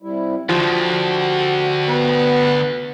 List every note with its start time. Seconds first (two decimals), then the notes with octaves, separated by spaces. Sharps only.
0.02 C3 G3 E4
0.49 D2 D3 F3 F#4 G4
1.88 B3